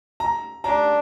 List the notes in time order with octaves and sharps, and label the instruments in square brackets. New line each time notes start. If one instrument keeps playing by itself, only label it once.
[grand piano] A#5
[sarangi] D4 [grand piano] A#5